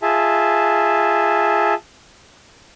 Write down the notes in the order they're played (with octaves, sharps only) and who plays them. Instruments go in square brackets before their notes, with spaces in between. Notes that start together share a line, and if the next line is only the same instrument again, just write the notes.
[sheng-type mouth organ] F4 G#4 E5 A5